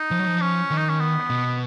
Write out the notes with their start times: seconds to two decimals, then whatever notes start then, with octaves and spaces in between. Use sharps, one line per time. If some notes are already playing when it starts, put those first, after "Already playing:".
Already playing: D#4
0.11 F3
0.19 F#3
0.27 F3
0.41 C#4
0.71 D#3
0.77 D#4
0.89 C#4
1.00 B3
1.30 B2